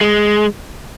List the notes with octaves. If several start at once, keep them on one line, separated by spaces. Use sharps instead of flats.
G#3